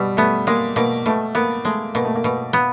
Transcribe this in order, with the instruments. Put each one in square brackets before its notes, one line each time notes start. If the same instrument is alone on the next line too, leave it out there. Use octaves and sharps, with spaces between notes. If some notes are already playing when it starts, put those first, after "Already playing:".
Already playing: [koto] B2 [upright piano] G3
[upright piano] A3 [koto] B3
[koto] G#3 [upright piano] A#3
[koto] B2 [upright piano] A#3
[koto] B2 [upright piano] A3
[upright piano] A#3 [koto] B3
[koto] G#3 [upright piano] A3
[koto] B2 [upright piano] A#3
[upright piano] A3
A#3
[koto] B2
B3